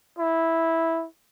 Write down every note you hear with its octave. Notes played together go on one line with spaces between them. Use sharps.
E4